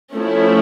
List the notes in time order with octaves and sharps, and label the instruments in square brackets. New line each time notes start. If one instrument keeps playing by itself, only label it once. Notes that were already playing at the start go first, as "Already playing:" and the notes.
[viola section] F3 A3 C#4 [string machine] E4